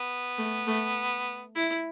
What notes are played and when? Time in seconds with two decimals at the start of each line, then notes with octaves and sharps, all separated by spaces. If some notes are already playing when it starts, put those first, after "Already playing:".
Already playing: B3
0.38 A3
0.67 A3
1.55 E4